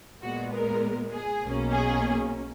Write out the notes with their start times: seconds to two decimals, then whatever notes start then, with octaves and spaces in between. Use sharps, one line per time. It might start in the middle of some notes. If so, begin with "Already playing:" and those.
0.22 A#2 G#3 B3 F#4
0.53 A#4
1.12 G#4
1.42 B1 B2 A#3 C#4
1.72 G#4